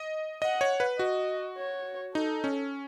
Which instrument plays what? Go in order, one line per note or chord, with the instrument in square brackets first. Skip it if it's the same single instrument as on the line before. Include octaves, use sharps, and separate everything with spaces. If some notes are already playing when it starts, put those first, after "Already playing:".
Already playing: [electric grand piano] D#5
[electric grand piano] D#5 [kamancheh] F#5
[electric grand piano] C#5
B4
[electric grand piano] F#4 [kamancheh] D#5
[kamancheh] C#5
[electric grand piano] D#4 [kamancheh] A4
[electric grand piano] C#4